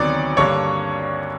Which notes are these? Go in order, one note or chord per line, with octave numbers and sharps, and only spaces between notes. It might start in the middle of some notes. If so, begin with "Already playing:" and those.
Already playing: D2 C3 D#3 F#3 B3 C#5 D5 D6
G2 D3 G3 A#3 C#5 C#6